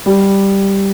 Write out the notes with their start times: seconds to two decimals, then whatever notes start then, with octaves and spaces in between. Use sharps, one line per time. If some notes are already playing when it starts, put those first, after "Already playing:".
0.06 G3